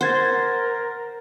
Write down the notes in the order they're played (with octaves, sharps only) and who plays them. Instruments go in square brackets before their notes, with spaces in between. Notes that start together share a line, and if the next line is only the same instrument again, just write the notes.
[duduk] A#4 [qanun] C5 [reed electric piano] F#5 G#6 A6